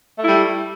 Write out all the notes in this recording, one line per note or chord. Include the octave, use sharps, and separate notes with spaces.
G3 A3 E4